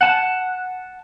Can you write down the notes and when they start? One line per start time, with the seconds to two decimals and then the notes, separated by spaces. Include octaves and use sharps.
0.01 F#5 A5